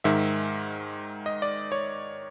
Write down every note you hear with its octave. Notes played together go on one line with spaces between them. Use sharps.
G#2 D#3 G#3 E5
D#5
D5
C#5